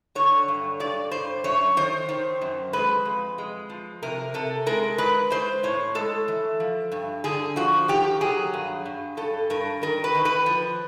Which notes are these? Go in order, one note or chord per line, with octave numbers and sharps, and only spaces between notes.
D3 C#5
G2
G2 D5
G2 C5
F#2 C#5
D#3 C5
D#3
F#2
G#3 B4
F2
G#3
F3
C3 A#4
C3 A4
G#3 A#4
G#3 B4
G#3 C5
A2 C#5
G#3 A4
E3
F3
G2
D3 G#4
F3 F#4
D#3 G4
F#3 G#4
G2
G2
G2 A4
G2 A#4
D#3 A#4
B4
D#3
B4
F3